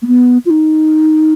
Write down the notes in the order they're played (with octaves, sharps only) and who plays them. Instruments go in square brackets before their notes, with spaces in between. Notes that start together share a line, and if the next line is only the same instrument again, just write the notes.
[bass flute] A#3
B3
F4
D#4